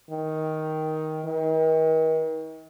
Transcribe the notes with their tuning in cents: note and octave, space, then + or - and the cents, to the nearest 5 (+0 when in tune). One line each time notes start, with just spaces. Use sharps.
D#3 +10
D#3 +40